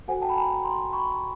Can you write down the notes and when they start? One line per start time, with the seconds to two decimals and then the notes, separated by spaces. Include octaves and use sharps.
0.08 F#4 A4 C5 F#5 G#5
0.22 G5 A5
0.29 B5
0.36 G#5 A#5
0.65 A#5 C6
0.93 B5 C#6